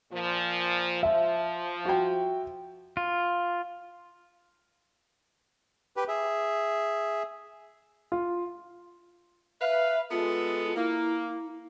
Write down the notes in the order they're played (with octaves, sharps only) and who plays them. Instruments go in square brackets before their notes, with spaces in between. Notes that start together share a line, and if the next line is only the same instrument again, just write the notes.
[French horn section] A#2 F3
[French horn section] F3 [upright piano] E5
[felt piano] F#4 G5
[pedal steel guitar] F4
[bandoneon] G4 B4
G#4 E5
[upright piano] F4
[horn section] B4 F5 [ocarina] E5
[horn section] G#3 B3 A4 [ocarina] F4
[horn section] A#3 [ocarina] E4